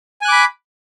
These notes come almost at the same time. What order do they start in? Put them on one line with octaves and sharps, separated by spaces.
G#5 F#6 D6 B5